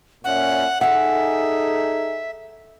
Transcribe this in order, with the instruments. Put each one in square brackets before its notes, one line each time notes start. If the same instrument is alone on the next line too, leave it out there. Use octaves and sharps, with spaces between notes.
[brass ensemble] A#2 C#4 E5 [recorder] F#5
[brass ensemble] D#4 G#4 A4 [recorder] E5 [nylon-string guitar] F#5